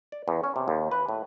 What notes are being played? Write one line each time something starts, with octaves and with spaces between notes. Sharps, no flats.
D5
E2
C#4
C3
D#2
B4
A2